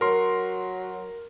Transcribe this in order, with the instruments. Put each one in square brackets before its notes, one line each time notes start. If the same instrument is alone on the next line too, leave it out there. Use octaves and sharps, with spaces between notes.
[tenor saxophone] F#3 [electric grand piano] A#4 C6